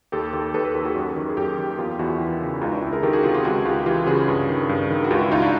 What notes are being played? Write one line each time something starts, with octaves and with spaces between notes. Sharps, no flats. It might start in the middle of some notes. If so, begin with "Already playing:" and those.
D#2 G4 A4
D#3 G4 A4
D#2 A4 B4
A4 B4
D#3 G4 A4
F#4 G#4
F#2
D#3
G#4
F#2 G4 A4
D#3
E2 F4 G4
E2 E4 F#4
E3
C#3
C#2 D#4 F4
D4 E4
C#2 D4 E4
G#4 A#4
D#3 G4 A4
F#4 G#4
C3 F4 G4
F4 G4
C#2 F#4 G#4
C#2 F4 G4
E3 F4 G4
C#3 F#4 G#4
G2
D#3
G2
D#3
F#4
C#2 F4 G4
E4 F#4
C#2 D#4 F4
D4 E4